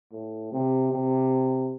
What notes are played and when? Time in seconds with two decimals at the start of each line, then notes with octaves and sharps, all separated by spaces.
0.12 A2
0.52 C3
0.92 C3